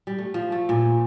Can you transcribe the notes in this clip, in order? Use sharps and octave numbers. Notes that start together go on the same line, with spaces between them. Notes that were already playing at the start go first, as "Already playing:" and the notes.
G3
A3
F3
A3
A#2